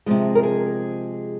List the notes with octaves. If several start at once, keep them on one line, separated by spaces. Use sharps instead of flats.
C3 F3 G#3
A#4
G#4